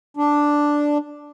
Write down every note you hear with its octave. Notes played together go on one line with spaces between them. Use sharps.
D4